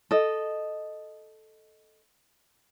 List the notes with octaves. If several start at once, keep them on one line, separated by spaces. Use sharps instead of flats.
A4 D#5